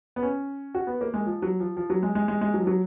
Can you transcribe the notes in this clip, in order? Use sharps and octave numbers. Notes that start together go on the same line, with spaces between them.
B3
C#4
F#4
B3
A#3
G#3
F3
F#3
F3
F3
F#3
G#3
G#3
G#3
G#3
F#3
F3
F#3